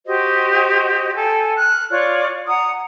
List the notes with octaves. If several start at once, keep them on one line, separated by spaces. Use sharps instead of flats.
F#4 G4 C5 D#5
A4 G5 G#5
F6 F#6
F4 C#5 D5
F#5 A#5 D#6